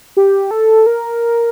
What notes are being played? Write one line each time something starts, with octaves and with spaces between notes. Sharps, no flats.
G4
A4
A#4